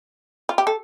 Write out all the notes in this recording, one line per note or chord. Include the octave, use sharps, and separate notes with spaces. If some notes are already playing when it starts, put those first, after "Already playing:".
F4
G4
A4